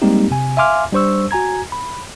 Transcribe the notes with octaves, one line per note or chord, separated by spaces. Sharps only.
G3 G#3 A#3 C4 D#4 G4
C3 G#5
E5 F5 G#5 C6 D6 F6
G3 D4 C5 C#6 E6
F#4 G#5 A#5 G#6
B5